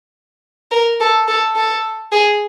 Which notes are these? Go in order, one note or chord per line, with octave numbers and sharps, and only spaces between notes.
A#4
A4
A4
A4
G#4